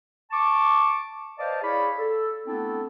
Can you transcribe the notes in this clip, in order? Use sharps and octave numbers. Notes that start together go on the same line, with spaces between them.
A5 C#6 D6
B4 C5 D5 D#5 F5 A5
E4 G#4 C#5 D5 F5 B5
A4
A3 B3 C4 D4 E4 A4